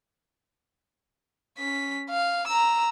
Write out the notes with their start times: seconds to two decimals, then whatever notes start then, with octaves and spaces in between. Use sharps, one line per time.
1.58 C#4 B6
2.10 F5
2.47 A#5 E6